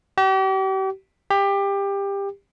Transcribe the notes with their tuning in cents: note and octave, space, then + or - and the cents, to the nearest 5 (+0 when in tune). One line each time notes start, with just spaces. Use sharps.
G4 -40
G4 +20